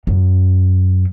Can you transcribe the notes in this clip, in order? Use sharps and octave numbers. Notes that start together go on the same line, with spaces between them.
F#2